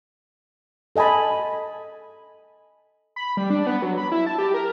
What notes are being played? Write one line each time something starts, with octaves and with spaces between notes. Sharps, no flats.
A4 D#5 G#5 A5 B5
B5
G3
D4
B3
F#3
B5
E4
A5
G4
A#4